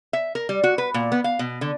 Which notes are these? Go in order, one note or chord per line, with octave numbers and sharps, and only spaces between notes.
E5
A#4
G3
F#4
B4
A#2
B3
F5
B2
D3